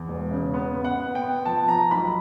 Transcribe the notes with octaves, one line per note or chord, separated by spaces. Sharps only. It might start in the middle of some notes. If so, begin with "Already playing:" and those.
Already playing: E2
E1
C#3
B3
B3
F#5
B3
G5
B3
F3 A5
F3 A#5
B1 B5